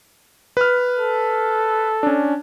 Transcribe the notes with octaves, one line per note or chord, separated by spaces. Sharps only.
B4 F6
A4
C#4 D4